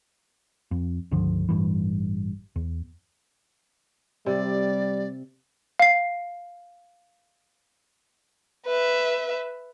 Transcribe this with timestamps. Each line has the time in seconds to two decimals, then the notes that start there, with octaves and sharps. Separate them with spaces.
0.71 F2
1.11 C#2 G2 D3 F3
1.49 A1 G2 E3
2.56 E2
4.26 C3 G3 D5
5.80 F5 C7
8.66 B4 E5